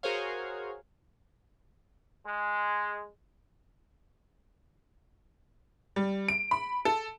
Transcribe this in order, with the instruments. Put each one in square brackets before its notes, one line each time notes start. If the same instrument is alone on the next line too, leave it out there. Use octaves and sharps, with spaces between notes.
[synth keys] F#4 G#4 A#4 C5 C#5 F5
[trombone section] G#3
[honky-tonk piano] G3
D7
B5
A4